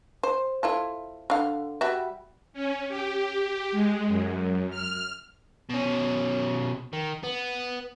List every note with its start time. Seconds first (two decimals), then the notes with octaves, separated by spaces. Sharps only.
0.23 C5
0.63 E4 F4 A4
1.30 D3 F5
1.81 G3 F#4 E5
2.53 C#4
2.89 G4
3.72 G#3
4.07 F#2
4.71 F6
5.70 B2 C#4
6.93 D#3
7.24 B3